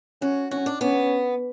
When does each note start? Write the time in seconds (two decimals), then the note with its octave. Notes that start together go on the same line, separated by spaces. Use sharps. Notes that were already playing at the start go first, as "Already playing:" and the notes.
0.22 C#4 F#4
0.51 C#4 F#4
0.66 D4
0.81 B3 C#4